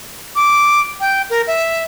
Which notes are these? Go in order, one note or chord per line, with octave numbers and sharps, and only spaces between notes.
D6
G5
A#4
E5